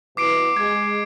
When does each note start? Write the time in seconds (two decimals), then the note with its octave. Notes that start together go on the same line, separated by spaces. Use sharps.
0.17 B2 E3 D6 C7 D7
0.56 G#3 G#6